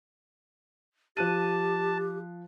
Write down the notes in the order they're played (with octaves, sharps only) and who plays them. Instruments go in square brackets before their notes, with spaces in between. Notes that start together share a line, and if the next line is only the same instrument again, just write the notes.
[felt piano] F3 F#6 D#7 [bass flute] G4 [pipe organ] A5